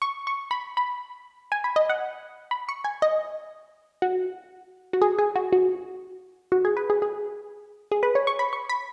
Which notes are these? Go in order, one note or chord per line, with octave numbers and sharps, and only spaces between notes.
C#6
C#6
B5
B5
G#5
B5
D#5
F#5
B5
C#6
G#5
D#5
F#4
F#4
G#4
G#4
F#4
F#4
F#4
G#4
B4
G#4
G#4
G#4
B4
C#5
C#6
B5
C#6
B5